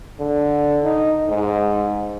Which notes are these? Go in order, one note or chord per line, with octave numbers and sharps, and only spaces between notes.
D3
D#4
G#2